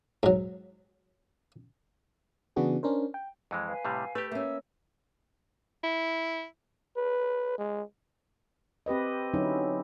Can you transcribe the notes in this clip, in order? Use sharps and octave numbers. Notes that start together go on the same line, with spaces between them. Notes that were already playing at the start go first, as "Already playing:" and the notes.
G#2 F#3
C#3 E3 B3 D4 F#4 G#4
C#4 D4 A#4 C5
G5
F2 E3 G#3
B4 F5 G#5
A2 C3 G3
A3 G4 B4
A#3 C#4 E5 E6
E4
B4
G#3
C4 G4 B4 D#5
D3 F#3 C#4 D#4 E4